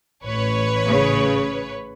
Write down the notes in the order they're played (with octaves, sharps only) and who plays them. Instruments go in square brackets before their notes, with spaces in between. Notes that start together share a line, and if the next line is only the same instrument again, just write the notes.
[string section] A1 [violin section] B4 C#5
[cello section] C#3